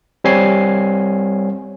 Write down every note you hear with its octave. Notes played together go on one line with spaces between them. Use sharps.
G3 C4 C#5 G#5 C7